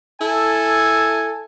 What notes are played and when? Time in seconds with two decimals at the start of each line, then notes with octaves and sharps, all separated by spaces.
0.21 E4 A4 G#5